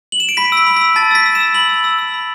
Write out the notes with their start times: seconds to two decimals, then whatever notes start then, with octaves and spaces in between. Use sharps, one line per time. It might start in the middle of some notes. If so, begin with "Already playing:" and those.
0.12 F#7
0.20 E7
0.29 D7
0.37 B5 B6
0.52 E6 B6
0.67 B5
0.76 E6 B6
0.96 A5 A6
1.11 E6 B6
1.26 E6
1.35 E7
1.40 E6
1.54 B5 F#7
1.69 E6
1.84 E6
1.98 E6
2.14 B5